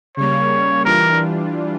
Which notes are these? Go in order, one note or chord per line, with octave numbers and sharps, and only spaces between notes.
C#3 G3 A#3 C#5
E3 G3 D4 F4 A#4